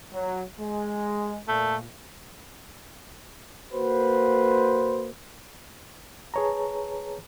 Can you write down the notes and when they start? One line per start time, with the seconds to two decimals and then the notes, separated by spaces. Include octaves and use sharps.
0.12 F#3
0.60 G#3
1.48 A#2 A3
3.73 A#3 F#4 B4 C5
6.34 G#4 B4 C#5 A5 A#5